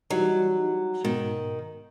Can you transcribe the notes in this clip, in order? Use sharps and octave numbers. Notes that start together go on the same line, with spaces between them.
E3 F#3 G3 D#4
G#2 B2 D#3